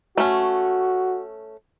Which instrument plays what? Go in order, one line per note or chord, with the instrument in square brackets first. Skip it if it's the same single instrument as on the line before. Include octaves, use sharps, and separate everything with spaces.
[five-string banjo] A3 C#4 [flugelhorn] F#4